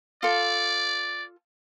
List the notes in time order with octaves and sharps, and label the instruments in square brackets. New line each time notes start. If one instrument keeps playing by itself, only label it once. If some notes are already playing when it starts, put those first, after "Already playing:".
[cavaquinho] F4 A4 [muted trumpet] D5